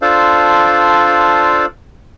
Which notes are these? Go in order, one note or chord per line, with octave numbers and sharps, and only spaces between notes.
D4 F4 A4 C5 D5 F5